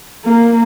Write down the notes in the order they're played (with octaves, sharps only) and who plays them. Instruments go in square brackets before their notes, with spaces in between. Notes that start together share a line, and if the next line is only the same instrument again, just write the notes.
[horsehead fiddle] A#3